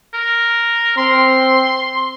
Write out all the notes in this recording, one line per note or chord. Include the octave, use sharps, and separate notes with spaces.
A#4
C4 C6